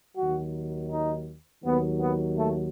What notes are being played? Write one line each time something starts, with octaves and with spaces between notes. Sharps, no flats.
D#2 D#3 F#3 F#4
D#4
D#2 D#3 F#3 B3
B3
A3